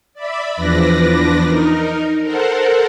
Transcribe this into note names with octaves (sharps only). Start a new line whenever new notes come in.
D5 E5 B5
E2 F3 D4 B4 D5 A#6
D#4 A#4
A4 A#4 C5 F#5